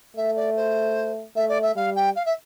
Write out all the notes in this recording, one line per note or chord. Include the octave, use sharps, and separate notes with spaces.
A3 E5
D5
C5
A3 E5
D5
E5
G3 F5
G5
F5
E5